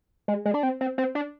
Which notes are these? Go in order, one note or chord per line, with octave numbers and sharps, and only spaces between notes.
G#3
G#3
D4
C4
C4
C4
D4